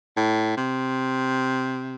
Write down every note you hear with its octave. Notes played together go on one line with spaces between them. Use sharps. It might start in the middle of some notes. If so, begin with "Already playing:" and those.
A2
C3